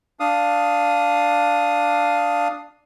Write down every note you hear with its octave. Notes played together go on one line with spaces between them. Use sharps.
D4 F5 D#6